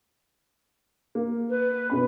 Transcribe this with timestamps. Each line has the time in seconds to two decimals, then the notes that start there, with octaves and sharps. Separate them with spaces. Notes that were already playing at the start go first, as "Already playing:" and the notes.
1.15 A#3
1.50 B4
1.90 B2 C#4 B5